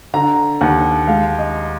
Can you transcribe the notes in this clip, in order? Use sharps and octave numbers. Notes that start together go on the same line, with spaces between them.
D3 A#5
D#2 F#5
G#3 F5
D#5